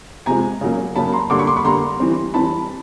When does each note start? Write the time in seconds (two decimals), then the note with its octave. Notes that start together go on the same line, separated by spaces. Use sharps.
0.26 C3 F3 G#3 G#5 A#5
0.61 C#3 F#3 A#3
0.96 C#3 F#3 A#3 A5 B5
1.13 A#5 C6
1.30 D3 G3 A#3 C6 D6
1.38 B5 C#6
1.47 C6 D6
1.56 B5 C#6
1.64 D3 G3 A#3 A#5 C6
2.00 E3 G3 C4
2.34 E3 G3 C4 A5 B5